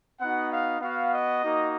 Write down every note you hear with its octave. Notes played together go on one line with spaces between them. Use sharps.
B3 D#4 F#4 F#5
F5
B3 F#4 F5
D#5
A#3 D#4 F#4